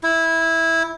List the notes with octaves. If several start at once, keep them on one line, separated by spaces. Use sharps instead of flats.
E4